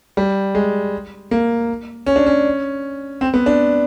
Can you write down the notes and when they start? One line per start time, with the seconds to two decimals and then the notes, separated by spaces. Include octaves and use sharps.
0.17 G3
0.55 G#3
1.31 A#3
2.06 C#4
2.16 D4
2.26 C#4
3.21 C4
3.34 B3
3.46 D4